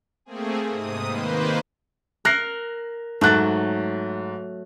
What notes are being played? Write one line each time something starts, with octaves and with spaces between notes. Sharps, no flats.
A3 A#3 C4 G#4
G#2 C3 D#6
D#3 A#3 B4 C5
A#4 F#6 A#6 C7
G#2 F#3 A3 F#6 A6